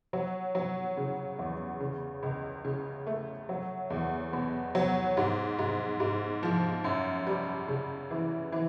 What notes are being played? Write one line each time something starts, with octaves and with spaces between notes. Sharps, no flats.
F#3
F#3
C#3
E2
C#3
C#2
C#3
A3
F#3
E2
B2
F#3
G#2
G#2
G#2
F3
F#2
G3
C#3
E3
E3